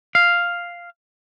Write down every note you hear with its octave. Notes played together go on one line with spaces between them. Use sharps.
F5